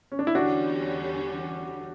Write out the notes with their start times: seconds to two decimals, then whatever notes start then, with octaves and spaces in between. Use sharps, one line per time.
0.12 C#4
0.19 D4
0.27 E4
0.35 E2 D3 G3 C#4 D4 F#4